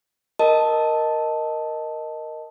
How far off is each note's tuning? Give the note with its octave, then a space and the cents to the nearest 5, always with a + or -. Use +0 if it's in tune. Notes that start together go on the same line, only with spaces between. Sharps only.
A#4 +0 D#5 +0 A5 +0